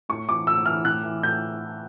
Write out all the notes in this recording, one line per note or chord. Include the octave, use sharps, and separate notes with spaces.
A2 C#6
E3 D6
A2 E6
E3 F6
A2 F#6
E3
A2 G6